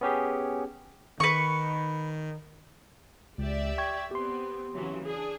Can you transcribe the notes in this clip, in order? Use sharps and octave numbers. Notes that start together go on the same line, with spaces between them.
B3 C#4 G4 G#4
D#3 B4 C#6
C#2 G4 D5 E5
G5 C#6 G#6
B3 C4 G4 C6
C#3 E3 F#3
D4 G#4